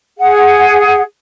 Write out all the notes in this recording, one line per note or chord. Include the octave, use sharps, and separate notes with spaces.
G#4 F#5